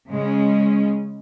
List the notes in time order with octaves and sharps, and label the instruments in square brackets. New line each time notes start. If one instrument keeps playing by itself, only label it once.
[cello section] C#3 G#3 C#4